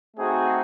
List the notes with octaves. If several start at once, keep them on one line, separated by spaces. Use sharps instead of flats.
A3 C4 D#4 F#4 G#4